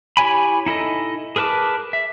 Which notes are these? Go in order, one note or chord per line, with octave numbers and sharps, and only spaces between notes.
E4 G4 C#5 G#5 B5
D#4 E4 A4 D#5
G#4 A#4 B4 A5 D6
E5